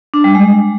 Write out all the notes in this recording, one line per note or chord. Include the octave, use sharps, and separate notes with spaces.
D4
G3
G#3